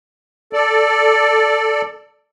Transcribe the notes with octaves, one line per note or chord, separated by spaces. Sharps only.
A4 D5